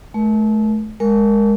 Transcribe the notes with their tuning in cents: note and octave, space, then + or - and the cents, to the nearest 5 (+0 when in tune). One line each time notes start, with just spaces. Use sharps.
A3 -35 A#4 +25
G#3 +0 A#4 +0